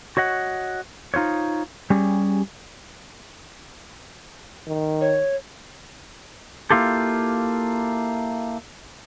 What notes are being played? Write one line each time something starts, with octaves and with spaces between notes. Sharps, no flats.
F#4 C#5 D#5 F#5
D#4 F4 C5 C#5
G3 C#4 G4 G#4
D#3
C#5
A#3 E4 F4 G4 A4